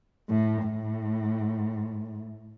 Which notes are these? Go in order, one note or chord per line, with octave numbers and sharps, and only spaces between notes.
A2
A2